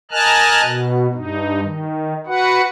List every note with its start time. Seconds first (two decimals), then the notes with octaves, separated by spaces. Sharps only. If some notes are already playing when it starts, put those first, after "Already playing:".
0.11 A#4 D#5 G#5 A5 F6 F#6
0.62 B2
1.14 G2 D#4
1.62 D#3
2.27 F#4 B4 F#5